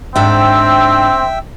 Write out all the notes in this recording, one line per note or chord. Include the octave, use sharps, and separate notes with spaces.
G#2 C4 D4 E5 G5 E6